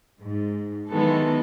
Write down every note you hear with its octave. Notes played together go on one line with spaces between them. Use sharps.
G#2
D#3 E3 F#3 G#3 B3 A4